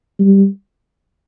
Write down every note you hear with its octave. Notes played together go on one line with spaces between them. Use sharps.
G3